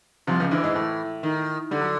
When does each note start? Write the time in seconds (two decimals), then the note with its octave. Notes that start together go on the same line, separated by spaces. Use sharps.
0.27 C2 C3 F3
0.40 C#2 C#3
0.51 D2 D3 E3
0.64 G#2 G#3
0.75 A2 A3
1.23 D#3
1.71 D3 G3
1.81 F#3